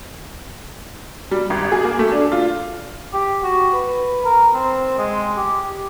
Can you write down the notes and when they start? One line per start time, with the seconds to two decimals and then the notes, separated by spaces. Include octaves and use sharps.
1.31 G3
1.50 G#1
1.72 G#4
1.84 A#3
1.99 A3
2.12 D4
2.32 F4
3.13 G4
3.43 F#4
3.73 B4
4.24 A#4
4.54 C4
4.98 G#3
5.37 G4